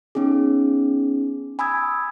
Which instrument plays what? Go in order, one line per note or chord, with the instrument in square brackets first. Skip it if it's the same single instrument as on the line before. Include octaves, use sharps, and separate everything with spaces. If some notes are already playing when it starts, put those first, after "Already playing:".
[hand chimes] B3 C#4 D#4 G#4
G#5 B5 D#6 E6 G#6